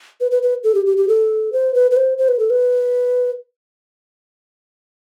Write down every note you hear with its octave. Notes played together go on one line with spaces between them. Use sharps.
B4
B4
B4
A4
G4
G4
G4
A4
C5
B4
B4
C5
C5
B4
A4
B4